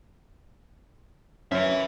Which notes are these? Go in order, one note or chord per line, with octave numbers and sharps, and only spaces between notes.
F#2 C#4 B4 C#5 E5